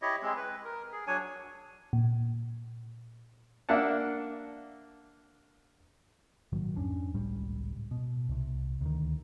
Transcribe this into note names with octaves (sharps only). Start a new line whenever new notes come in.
E4 G4 C#5 D#5
G#3 C4
B4
A#4
G#4
F#3 D4 C#5 G#5
A#2
A#3 D4 E5 F#5 A5
A#1 G#2 D#3 F#3
F2 C#4 D4
G#1 C#2 A2 G3
B2
C2 C3
D2 D#3